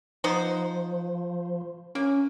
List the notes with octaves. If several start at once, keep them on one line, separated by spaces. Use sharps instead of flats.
F3 B3 D#4 C5
A#3 C#4